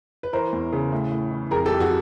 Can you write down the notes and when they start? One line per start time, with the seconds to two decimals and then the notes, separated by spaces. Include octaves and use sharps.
0.23 B4
0.33 E3 A#4 C5
0.53 E2
0.72 C#3
0.92 A2
1.12 A2
1.31 E3
1.51 F2 G#4 A#4
1.65 G4 A4
1.71 F2
1.80 F#4 G#4